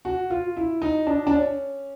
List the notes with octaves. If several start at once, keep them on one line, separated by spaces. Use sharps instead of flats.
F#4
F4
E4
D#4
D4
D4
C#4